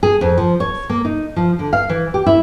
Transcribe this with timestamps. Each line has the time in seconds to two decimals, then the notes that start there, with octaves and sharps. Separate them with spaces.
0.03 G#4
0.21 F2
0.37 F3
0.60 C#5
0.90 A#3
1.05 D#4
1.36 F3
1.59 D3
1.73 F5
1.89 E3
2.14 G4
2.26 E4